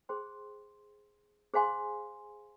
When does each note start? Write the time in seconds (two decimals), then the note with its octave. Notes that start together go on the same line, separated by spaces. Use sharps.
0.09 G#4 C5 G5 C6
1.54 G#4 C5 F5 G#5 C6